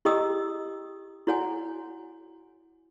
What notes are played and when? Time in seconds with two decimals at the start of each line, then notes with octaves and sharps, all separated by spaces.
0.05 E4 G4 D#5 G5 D#6 E6
1.27 E4 F#4 C#5 F#5 G#5